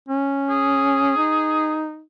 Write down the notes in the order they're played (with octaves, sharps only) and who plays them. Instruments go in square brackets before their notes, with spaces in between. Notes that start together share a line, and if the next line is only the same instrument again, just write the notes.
[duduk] C#4
[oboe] G#4
[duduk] D#4